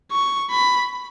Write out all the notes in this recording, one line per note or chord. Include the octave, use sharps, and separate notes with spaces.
C#6
B5